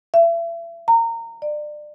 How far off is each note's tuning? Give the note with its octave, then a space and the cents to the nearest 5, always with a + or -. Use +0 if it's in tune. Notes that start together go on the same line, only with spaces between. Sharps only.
E5 +35
A#5 -25
D5 +30